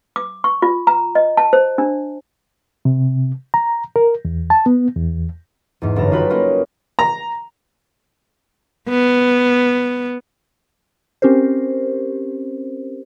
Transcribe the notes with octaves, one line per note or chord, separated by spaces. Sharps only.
D6
C#6
F4
A#5
D#5
A5
C5
D4
C3
A#5
A#4
E2
A5
B3
E2
E2 G#2
G1 F#2 E3 A#3 A4 A#5
D#4 F4 F#4 B4 G5 B5
A#3 C#4 D#4 F4 A#4
A#5
B3
C4 C#4 G4 A#4 C5